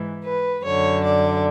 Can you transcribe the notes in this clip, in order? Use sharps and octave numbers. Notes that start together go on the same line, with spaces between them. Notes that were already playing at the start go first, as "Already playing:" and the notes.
Already playing: G#2 E3
B4
F#2 D3 C#5
D5